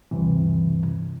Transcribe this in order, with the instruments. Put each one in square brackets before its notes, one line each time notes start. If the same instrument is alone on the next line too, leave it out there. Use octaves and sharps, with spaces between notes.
[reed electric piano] D2 G2 C3 E3